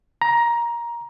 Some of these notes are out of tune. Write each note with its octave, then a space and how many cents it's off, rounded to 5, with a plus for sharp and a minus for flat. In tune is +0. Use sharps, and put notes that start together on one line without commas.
A#5 +15